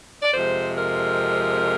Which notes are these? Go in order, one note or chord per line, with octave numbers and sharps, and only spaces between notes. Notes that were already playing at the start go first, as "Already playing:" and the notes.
D5
F2 C3 F3 G#3 C5
A#4